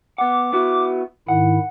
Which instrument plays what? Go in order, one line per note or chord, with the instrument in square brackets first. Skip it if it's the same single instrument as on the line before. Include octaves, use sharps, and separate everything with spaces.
[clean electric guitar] B3 F#5 [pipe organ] D6
[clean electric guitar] B3 E4 F#4
[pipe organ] G#2 D#3 E4 [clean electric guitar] F#5